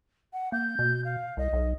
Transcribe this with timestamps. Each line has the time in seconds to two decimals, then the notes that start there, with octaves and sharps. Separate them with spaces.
0.33 F#5
0.52 A#3 G6
0.79 B2
1.04 F5
1.37 C2 D#5
1.53 B1